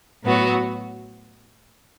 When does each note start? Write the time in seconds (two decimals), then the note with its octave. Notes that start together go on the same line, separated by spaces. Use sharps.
0.23 A2 F#3 B3 F#4